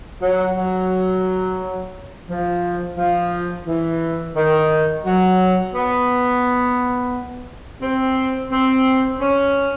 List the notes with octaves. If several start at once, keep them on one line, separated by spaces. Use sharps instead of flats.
F#3
F#3
F3
F3
E3
D#3
F#3
B3
C4
C4
C#4